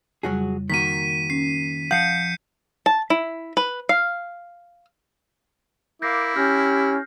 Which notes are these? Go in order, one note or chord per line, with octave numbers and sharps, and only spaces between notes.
F2 C#3 F#3 G3 F#4 G#4
D#3 A#3 F#4 B6 D#7
C#4 C7
F3 F5 F#5 F#6 G6 C7 C#7
A5
E4
B4
F5
E4 A#4 F5 D6 G6 A#6 C7
C#4 G4 F6 G6 A#6